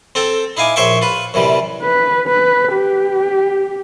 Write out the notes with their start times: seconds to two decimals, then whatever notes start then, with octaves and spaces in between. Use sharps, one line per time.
0.15 C4 A4 G5
0.57 D#4 E4 F5 G#5 D6
0.76 A#1 C5 C#5 E5 G5 C#6
1.02 F4 B4
1.34 F#2 C3 E3 G3
1.82 B4
2.29 B4
2.73 G4